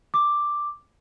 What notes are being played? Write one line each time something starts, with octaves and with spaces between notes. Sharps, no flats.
D6